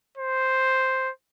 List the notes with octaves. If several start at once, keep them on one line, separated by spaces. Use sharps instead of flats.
C5